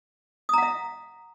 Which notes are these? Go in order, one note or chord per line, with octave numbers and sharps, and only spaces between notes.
E5 F#5 A#5 D#6